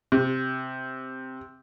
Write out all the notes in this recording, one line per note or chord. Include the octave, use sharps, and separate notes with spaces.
C3